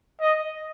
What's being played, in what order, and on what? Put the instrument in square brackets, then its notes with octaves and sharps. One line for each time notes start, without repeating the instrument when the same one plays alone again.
[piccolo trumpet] D#5